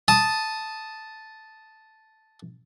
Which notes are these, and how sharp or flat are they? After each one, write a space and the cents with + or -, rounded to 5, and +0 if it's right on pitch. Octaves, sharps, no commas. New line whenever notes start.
A5 -5 D#6 +0